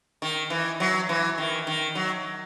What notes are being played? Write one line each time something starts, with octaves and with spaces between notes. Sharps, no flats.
D#3
E3
F#3
E3
D#3
D#3
F#3